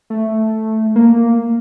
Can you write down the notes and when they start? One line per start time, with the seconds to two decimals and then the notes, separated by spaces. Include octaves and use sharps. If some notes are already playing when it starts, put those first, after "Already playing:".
0.10 A3
0.96 A#3